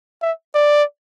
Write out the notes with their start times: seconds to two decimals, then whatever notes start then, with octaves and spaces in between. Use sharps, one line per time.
0.22 E5
0.55 D5